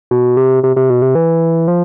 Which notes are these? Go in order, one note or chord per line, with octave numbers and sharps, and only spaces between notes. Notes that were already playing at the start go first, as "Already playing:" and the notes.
B2
C3
C3
C3
B2
C3
E3
F3